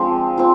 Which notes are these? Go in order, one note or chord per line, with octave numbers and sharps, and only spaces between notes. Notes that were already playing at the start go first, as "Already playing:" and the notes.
Already playing: F3 G#3 C4 D4
C4 F4